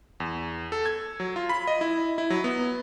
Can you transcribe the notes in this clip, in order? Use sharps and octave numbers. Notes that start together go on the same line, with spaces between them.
E2
A4
G#6
F#3
F4
B5
D#5
E4
E4
F#3
B3